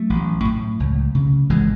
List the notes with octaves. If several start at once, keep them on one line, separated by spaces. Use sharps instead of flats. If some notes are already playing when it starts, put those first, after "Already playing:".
Already playing: F#3 A3
A1
A2
C#2
C#3
G#1 E3 G#3